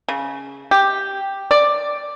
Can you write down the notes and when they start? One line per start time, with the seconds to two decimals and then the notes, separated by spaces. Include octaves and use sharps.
0.09 C#3
0.71 G4
1.51 D5